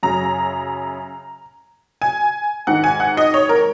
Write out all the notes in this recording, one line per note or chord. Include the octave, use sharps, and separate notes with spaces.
F#2 C#3 A#5
G#5
G#2 D#3 F#5
G#5
F#5
D#5
C#5
A#4